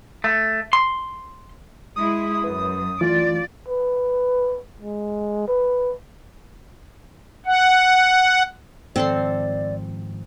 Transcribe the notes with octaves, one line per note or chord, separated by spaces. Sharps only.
A3
C6
G#3 E4 D#6
F#2 B4
E3 A3 F4 D5
B4
G#3
B4
F#5
G#2 D#3 F3 C4 A4 D5 C6